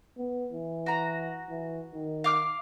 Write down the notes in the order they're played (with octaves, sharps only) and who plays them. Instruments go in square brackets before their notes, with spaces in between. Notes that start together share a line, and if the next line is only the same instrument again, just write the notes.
[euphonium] B3
E3
[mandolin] F#4 A#5
[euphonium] E3
D#3
[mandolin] F5 D6 F6